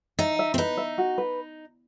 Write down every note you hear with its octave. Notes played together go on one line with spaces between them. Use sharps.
D#4 E5
E5
C4
D#4 B4
E5
F#4
B4